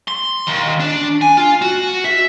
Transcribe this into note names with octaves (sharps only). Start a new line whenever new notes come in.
C6
D#2
D4
G#5
F4
F#4
E5